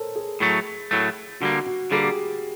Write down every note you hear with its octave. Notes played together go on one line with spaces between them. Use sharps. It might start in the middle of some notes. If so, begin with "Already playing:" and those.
Already playing: A4 A#4 C5 C#5
G#4
A2 F#3 A3
A2 F#3 A3
D3 G3 A#3 F#4
F#4
D3 G3 A#3 G#4
G4